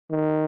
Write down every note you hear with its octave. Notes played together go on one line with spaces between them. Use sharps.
D#3